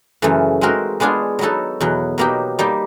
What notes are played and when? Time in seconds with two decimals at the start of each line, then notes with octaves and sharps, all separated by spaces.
0.22 F#2 C#3 E3 A3
0.61 G#3 C4 D#4 F#4 A#4
1.00 G#3 B3 D4 F4 G#4
1.39 F#3 B3 D#4 F#4 A4
1.80 E2 B2 F#3
2.18 B2 F#3 A#3 D#4 G4
2.59 G3 A#3 D#4 G4